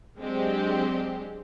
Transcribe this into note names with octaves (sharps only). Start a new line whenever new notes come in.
F#3 G#3 C4 D4 G4